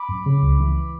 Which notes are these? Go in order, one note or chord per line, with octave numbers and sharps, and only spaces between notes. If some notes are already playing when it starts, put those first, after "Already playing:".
Already playing: B5 D6
F#2
C#3
C#2
E3